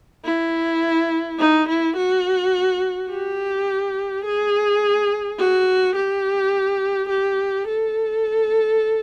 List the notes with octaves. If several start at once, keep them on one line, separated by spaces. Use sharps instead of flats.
E4
D#4
E4
F#4
G4
G#4
F#4
G4
G4
A4